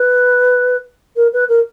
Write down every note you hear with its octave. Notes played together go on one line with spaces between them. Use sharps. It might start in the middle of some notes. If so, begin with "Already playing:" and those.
Already playing: B4
A#4
B4
A#4